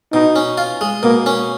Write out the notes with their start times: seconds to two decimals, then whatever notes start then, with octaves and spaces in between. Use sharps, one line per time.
0.13 B2 D#4
0.36 C#4
0.58 F4
0.81 G#3
1.03 B2 A#3
1.26 C#4